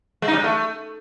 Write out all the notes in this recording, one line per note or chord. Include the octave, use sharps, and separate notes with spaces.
G#3
D#4
G3
G#3
A3